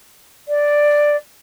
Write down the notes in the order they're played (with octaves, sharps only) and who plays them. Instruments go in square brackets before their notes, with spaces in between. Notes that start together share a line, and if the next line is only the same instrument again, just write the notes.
[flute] D5